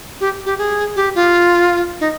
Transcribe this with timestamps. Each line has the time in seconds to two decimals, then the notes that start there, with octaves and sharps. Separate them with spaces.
0.21 G4
0.46 G4
0.58 G#4
0.96 G4
1.15 F4
2.00 D#4